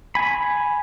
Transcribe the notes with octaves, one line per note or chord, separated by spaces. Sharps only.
G#5 B5